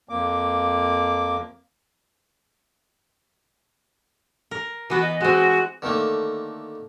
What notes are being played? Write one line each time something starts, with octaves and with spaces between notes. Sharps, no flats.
F2 A#3 D6
A#4
E3 B3 F#4 B4
D#5
G#3 C4 F#4
D3 D#3 A3 A#3